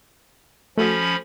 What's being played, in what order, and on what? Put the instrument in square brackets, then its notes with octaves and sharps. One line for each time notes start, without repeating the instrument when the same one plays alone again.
[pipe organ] F3 C#4 B5 [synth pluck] A3 F#4 A4